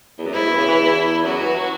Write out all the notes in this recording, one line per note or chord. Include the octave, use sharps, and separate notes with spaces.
E2
F#2
G#2 E4
B2
C#3
E3
E2
F#2 F#4
E3
F#3